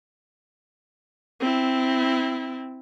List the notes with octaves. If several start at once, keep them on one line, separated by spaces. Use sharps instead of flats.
C4 E4